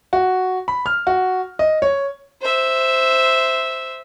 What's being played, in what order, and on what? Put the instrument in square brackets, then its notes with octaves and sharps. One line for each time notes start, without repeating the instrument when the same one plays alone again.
[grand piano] F#4
B5
F6
F#4
D#5
C#5
[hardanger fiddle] C5 E5